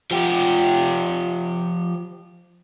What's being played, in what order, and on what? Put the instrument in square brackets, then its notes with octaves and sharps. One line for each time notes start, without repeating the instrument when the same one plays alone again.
[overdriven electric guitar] F3 G4